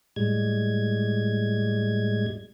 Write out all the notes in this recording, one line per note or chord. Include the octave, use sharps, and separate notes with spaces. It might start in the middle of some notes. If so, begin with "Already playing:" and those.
A2 G3 G#3 G#6